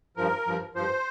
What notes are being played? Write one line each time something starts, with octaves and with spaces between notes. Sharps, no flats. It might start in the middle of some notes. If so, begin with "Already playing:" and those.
G2 F3 A#4
G2 F3
G2 F3 C5